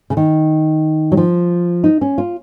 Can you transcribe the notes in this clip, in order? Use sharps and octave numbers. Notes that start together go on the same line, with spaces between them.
C#3
D#3
F#3
F3
D#4
C#4
F4